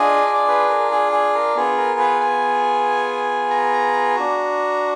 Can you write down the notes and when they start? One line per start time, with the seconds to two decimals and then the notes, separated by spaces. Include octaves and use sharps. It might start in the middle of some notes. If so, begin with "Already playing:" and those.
Already playing: D4 F4 G#4 D#5
0.26 D5
0.48 B4
0.69 A#4
0.91 G#4
1.12 G#4
1.35 A#4
1.56 B3 F4 G#4
1.77 A#4
1.99 B4
2.21 G#5
3.50 A#5
4.16 D4 F#4